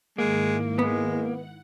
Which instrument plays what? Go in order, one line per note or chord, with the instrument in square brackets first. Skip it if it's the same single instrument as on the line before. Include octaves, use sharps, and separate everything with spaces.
[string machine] G#2 D#3 E4 [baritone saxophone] G#3 [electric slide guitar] A#3
[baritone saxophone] G#3 [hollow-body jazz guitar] B3
[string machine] F#5